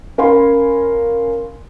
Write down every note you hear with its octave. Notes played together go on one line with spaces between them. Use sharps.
C#4 A#4 F5 G#5 B5 C6